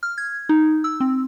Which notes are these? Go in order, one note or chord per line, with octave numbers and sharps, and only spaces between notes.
F6
G#6
D#4
E6
C4